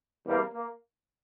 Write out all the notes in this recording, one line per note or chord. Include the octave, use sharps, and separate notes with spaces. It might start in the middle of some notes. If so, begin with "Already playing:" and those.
E2 C3 G3 A#3
A#3